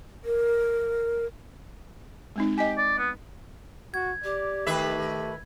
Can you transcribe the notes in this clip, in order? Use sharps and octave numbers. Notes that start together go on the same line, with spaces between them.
A#4
G#3 C4 D#4
G4 D#5 G#5
D5
B3
F#4 G#6
G4 D5
D#3 A3 B4 E5